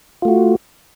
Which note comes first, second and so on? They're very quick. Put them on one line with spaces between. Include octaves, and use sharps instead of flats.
F4 A3 F#4